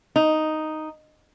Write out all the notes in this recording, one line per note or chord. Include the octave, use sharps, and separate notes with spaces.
D#4